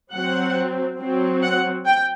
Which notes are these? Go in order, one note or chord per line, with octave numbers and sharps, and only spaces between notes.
F#3 C4 F#5
F#3 C4
F#5
G5